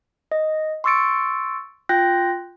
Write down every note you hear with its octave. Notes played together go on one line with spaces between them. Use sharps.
D#5
C6 C#6 E6 A6 C#7 D7
F4 G5 F#6 G6 A#6